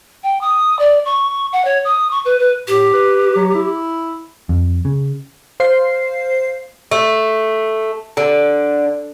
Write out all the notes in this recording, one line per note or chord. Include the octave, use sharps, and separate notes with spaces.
G5
D#6
D5
C#6
F#5
C#5
D#6
C#6
B4
B4
A2 G4
B4
F#3
E4
F2
C#3
C5 F5 C7
A3
D3